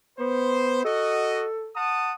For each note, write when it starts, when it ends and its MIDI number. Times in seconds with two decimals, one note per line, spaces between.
0.19 0.84 59
0.19 0.84 72
0.84 1.47 66
0.84 1.71 69
0.84 1.47 75
1.76 2.13 78
1.76 2.13 81
1.76 2.13 87